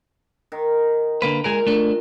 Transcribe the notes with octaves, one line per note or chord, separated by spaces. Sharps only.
D#3
D3 A#3 B4
A#2 G#3 G#4 A#4
A3 D4